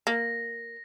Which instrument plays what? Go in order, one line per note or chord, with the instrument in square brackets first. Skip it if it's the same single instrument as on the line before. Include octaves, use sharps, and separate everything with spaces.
[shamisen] A#3 [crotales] A#6